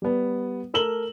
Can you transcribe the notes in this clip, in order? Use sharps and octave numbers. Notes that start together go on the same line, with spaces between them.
G3 B3
A3 A#4 E6 E7 F#7 G7